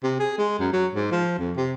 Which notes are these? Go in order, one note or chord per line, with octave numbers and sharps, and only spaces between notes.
C3
G#4
G#3
F#2
F#3
G#2
F3
F2
C3